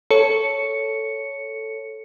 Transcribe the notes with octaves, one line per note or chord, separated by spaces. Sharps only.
A4 C#5 C#7